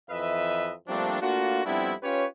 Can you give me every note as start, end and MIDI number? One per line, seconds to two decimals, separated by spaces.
0.11 0.73 41
0.11 0.73 52
0.11 0.73 71
0.11 0.73 75
0.11 0.73 76
0.88 1.18 53
0.88 1.18 55
0.88 1.18 57
0.88 1.18 58
0.88 1.18 60
0.88 1.18 62
1.21 1.62 57
1.21 1.62 58
1.21 1.62 62
1.21 1.62 65
1.21 1.62 66
1.65 1.93 41
1.65 1.93 55
1.65 1.93 59
1.65 1.93 60
1.65 1.93 62
1.65 1.93 64
2.03 2.25 61
2.03 2.25 65
2.03 2.25 67
2.03 2.25 71
2.03 2.25 73